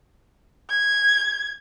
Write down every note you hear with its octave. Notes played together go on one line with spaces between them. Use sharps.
G#6